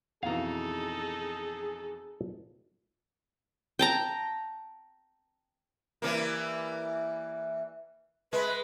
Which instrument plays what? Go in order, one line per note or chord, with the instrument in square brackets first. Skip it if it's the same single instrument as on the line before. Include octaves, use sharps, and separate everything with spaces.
[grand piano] F2 B2 E3 [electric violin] D#4 A4 [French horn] G#4 [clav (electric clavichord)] F5 A#5
[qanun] G5 A5 A#5
[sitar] E3 G3 A#3
[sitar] G#3 [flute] B4